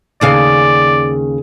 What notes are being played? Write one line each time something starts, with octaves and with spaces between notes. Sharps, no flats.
D#2 C#3 D5 F5